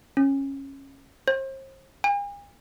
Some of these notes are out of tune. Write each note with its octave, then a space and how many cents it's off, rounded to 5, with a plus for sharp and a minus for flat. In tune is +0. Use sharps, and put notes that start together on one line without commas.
C#4 -15
C5 +40
G#5 -45